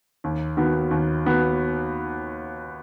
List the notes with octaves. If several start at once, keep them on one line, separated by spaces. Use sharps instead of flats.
D#2
D#3 B3 F#4
D#2
D#3 B3 F#4